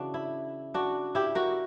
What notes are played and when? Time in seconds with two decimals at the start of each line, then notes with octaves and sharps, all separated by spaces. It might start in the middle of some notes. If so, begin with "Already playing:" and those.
Already playing: C#3 E3 D4 F#4
0.14 E4
0.74 D4 F#4
1.15 E4 G4
1.35 F#4 A#4